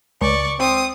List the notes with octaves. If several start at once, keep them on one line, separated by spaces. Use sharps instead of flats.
C#2 D5 C#6
C4 D#6